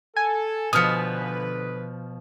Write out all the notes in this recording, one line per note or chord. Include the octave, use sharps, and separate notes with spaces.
A4 G#5
B2 D3 F3 B4 D#6 F6 C#7